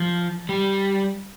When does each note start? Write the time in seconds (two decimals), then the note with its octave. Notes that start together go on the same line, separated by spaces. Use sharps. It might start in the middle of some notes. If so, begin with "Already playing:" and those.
Already playing: F3
0.49 G3